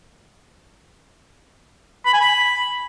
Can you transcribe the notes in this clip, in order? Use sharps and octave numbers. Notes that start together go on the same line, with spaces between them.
B5
G#5
B5